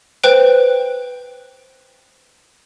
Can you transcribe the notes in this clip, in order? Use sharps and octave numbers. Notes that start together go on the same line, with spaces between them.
B4 C5 G5 F#6 D7